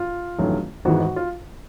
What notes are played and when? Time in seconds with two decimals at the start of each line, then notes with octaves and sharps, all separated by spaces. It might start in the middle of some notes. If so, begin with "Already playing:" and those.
Already playing: F4
0.39 A1 G2 D#3 F#3 A3
0.85 G#1 G#2 E3 G#3 F#4
1.00 F#4
1.16 F4